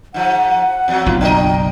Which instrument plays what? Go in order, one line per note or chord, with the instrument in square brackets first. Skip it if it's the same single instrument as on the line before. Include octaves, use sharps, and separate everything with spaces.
[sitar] G#2 F3 [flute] F#5
[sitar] E2 F#3
[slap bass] F#1 B1 [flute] F4
[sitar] D4 A#4 D#5 [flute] G5